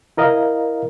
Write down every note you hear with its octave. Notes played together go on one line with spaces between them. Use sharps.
E4 A#4 D#5 F5